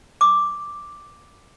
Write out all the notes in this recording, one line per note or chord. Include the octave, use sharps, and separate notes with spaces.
D6